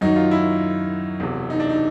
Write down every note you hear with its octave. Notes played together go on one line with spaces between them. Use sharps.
F#2 D#3 F#3 D#4
F4
E4
E1 E2 C3
D#4
D4
D#4